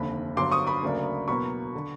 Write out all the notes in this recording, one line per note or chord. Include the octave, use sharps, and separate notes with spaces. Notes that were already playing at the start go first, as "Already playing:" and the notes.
Already playing: F1 D#2 D3 B5
G1 G2 D3 F#3 C6 D6
C#6 D#6
B5 C#6
D2 C#3 F#3 A#3 D4
E2 B2 F#3 A#3 B5 C#6
D3